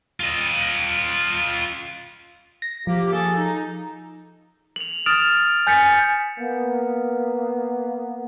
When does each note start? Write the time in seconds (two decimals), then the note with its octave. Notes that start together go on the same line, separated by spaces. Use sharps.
0.20 F4 D#5
2.62 A#6
2.87 F3 A#3 G4
3.13 G#4 A4
3.37 D#4
4.76 F7 F#7
5.06 D#6 F6 A6 D7 E7 F7
5.67 G#5 G6 A6 B6 C#7
6.39 A#3 B3